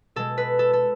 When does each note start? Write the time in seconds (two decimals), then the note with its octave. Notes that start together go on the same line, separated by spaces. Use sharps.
0.16 B2 G#3 A4
0.38 B4
0.59 A4
0.73 A4